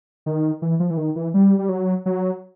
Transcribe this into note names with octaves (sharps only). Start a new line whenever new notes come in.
D#3
E3
F3
E3
D#3
E3
G3
G3
F#3
F#3